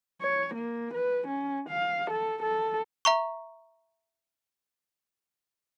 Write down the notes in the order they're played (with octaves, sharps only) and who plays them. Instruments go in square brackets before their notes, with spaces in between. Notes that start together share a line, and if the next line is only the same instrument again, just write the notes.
[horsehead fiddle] C#5
A#3
B4
C#4
F5
A4
A4
[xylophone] E5 A#5 C#6